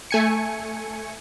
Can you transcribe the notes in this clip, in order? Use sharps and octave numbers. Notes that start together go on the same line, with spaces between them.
A3 G#5 C#7